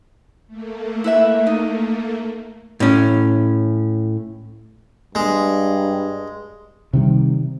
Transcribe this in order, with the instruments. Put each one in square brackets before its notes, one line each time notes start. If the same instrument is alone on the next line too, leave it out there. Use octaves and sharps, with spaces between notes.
[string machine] A3 A#3
[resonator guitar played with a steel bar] E4 B4 E5
D#4
[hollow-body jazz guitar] A2 C#4
[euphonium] G2 [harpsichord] G#3
[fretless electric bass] C3 D#3 G3